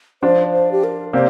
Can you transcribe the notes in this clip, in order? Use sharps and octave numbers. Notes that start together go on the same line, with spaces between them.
F3 D4 F4 C5
C5
G4
A#4
C3 A#3 G4 C5 D5